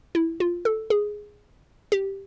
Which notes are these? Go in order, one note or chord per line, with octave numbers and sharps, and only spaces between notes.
E4
F4
A4
G#4
G4